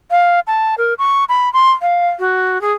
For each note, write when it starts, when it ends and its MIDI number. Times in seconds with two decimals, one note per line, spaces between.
0.11 0.40 77
0.47 0.75 81
0.78 0.94 70
0.98 1.25 85
1.29 1.52 83
1.53 1.71 84
1.82 2.09 77
2.19 2.61 66
2.61 2.73 68